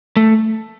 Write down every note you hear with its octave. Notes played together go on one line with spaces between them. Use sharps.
A3